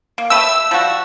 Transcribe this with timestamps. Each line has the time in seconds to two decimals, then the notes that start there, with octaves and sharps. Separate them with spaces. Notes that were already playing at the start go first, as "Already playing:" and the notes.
0.18 A#3
0.30 A3 G4 B4 E6
0.43 E5
0.71 F3 G3 F#4